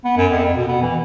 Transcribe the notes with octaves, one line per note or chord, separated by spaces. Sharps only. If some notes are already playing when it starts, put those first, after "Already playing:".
B3
F#2
F2
F2
B2
B3
E3